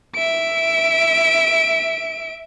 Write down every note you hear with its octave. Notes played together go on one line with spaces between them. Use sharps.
E5 D7